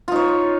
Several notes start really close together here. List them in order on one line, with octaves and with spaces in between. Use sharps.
F4 D#4 C#5